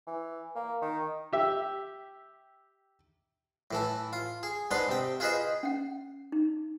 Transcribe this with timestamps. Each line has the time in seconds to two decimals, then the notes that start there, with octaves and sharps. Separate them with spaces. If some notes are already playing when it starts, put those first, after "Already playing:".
0.07 E3
0.56 A#3
0.82 D#3
1.33 G4 E5
3.71 A2 E3 A4
4.13 F4
4.43 G#4
4.71 G#2 B3 D4 C6 D#6
4.89 C3 G5
5.20 F4 G#4 B4 C5 D#5
5.63 C#4 F#5
6.32 D#4